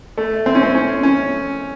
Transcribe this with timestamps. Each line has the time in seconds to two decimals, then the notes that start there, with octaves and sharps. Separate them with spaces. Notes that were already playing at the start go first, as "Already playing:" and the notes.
0.18 A3
0.46 C4
0.55 C#4
0.63 C4
0.75 C#4
1.03 C#4